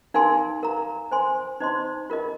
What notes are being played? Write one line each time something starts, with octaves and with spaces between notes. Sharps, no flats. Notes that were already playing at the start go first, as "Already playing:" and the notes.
D#4 A#4 F5 G#5 C6
A#4 F5 A#5
C5 G#5 C6
D#4 C5 D#5 C6
F4 A#4 D#5